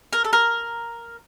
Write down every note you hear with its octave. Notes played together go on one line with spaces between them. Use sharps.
A#4
A4
A#4